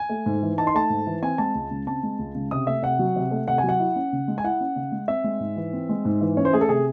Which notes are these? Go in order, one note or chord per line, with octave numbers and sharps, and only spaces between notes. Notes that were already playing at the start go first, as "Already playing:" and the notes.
Already playing: G#5
A3
G#2
E3
D#4 A5
C6
A3 A5
G#2
E3
C4 G#5
G#3 A5
C#2
C#3
C4 A5
G#3
C#2
C#3
C3 D#6
A3 E5
C3 F#5
F#3
C3
A3
C3 F#5
G#5
F#3
F#5
E4
C#4
C#3
G#3
G#5
E4 F#5
C#4
C#3
G#3
C4 E5
G#3
G#2
E3
C4
G#3
G#2
E3
C#4 C#5
C5
A3 G#4
A4
C3 G#4